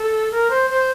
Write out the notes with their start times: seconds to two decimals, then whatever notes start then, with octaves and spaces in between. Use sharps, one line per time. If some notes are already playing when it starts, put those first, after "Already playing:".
Already playing: A4
0.32 A#4
0.50 C5
0.70 C5